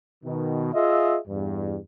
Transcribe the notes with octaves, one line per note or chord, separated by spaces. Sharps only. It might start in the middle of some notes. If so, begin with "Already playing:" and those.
B2 D#3
F4 G#4 D#5 E5
E2 G2